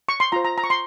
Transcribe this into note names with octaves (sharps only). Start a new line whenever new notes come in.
C#6
C6
F4 C5 A#5
A#5
A#5
C#6
C6